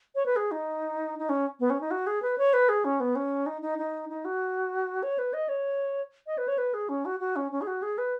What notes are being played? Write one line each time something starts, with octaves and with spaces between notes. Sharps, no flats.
C#5
B4
G#4
D#4
D#4
C#4
B3
C#4
D#4
F#4
G#4
B4
C#5
B4
G#4
C#4
B3
C#4
D#4
D#4
D#4
D#4
F#4
C#5
B4
D#5
C#5
D#5
B4
C#5
B4
G#4
C#4
F#4
F#4
C#4
C#4
G#4
F#4
G#4
B4